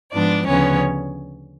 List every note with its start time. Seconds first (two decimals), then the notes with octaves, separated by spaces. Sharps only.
0.13 G#2 F3 G#3 B3 D4 D5
0.46 D2 C#3 F3 B3 C#4 C#5